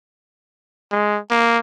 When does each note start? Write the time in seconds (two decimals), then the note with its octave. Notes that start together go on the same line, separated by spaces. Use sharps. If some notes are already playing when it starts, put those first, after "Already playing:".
0.92 G#3
1.31 A#3